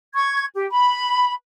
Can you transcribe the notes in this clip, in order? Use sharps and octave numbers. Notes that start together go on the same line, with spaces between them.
C#6 G#6
G4
B5